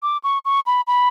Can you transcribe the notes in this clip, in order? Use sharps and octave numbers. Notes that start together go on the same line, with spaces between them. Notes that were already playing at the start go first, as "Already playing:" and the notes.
D6
C#6
C#6
B5
B5